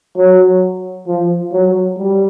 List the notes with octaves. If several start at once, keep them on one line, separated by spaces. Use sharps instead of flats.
F#3
F3
F#3
G3